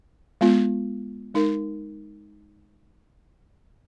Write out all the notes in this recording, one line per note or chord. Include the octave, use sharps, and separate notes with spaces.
G#3 B3 F4
G#3 D#4 A#4